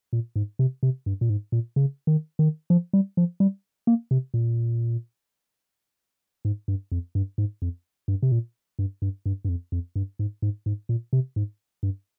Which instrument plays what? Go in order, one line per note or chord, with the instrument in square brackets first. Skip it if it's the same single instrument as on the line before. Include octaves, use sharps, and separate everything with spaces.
[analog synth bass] A#2
G#2
C3
C3
G2
A#2
G#2
A#2
C#3
D#3
D#3
F3
G3
F3
G3
A#3
C3
A#2
G#2
G2
F2
G2
G#2
F2
G2
C3
A#2
G2
G2
G2
G2
F2
F2
G2
G#2
G#2
G#2
A#2
C3
G#2
G2